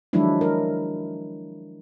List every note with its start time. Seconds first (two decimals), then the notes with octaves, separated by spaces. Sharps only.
0.13 D#3 F3 F#3 G#3 D4 E4
0.41 A#4